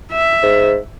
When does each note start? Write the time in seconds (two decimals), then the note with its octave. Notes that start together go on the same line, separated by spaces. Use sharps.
0.12 E5
0.43 G#2